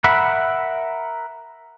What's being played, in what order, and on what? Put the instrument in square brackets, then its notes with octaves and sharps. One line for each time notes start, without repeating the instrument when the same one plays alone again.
[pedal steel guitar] A#4 E5 F#5 B5